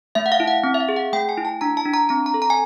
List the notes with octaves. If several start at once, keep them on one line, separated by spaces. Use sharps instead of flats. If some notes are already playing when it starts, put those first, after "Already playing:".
A3 E5
F#5
F5
E4
F#5
C4 F#5
E5
F5
G#4
F#5
A3 G5
G#5
E4
A5
D4 A#5
A5
D4
A#5
C4 A#5
A#5
A4
A#5
G#5